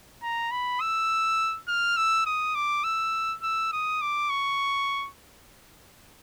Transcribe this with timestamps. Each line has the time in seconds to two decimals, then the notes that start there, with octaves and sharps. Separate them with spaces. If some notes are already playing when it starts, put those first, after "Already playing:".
0.23 A#5
0.51 B5
0.80 E6
1.68 F6
1.97 E6
2.26 D#6
2.55 D6
2.84 E6
3.43 E6
3.72 D#6
4.01 D6
4.30 C#6